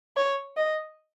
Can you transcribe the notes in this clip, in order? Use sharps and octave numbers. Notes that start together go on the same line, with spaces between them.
C#5
D#5